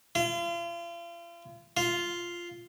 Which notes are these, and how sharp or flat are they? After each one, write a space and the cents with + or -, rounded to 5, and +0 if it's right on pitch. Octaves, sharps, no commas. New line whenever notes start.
F4 -40
F4 -5